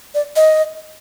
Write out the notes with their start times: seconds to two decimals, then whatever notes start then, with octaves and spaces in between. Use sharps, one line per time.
0.15 D5
0.36 D#5